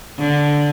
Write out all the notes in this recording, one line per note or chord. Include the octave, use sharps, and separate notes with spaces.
D3